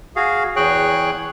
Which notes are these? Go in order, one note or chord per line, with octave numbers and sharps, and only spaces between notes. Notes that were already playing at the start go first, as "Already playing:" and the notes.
F#4 G#4 F5
E2 G#4 C#5 G5 F#6